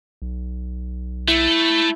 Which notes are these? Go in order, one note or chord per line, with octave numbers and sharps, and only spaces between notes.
B1
A3 E4